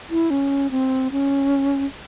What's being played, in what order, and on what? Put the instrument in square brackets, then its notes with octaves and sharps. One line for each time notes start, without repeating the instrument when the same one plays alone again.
[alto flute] E4
C#4
C4
C#4